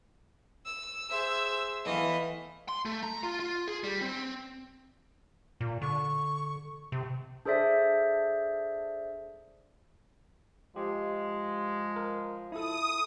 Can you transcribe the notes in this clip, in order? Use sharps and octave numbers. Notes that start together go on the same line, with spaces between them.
E6
G#4 C5 E5
E3 A3 B3 D#5 F5
C6
A3
A#5
F4
F4
G#4
G3
C4
A#2
D3 C#6
C3
D4 G#4 A4 C5 D5 E5
F3 G#3 G4
A#4
E4 A4 D#6